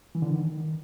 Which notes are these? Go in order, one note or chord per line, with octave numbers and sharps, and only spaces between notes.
E3
D3
D#3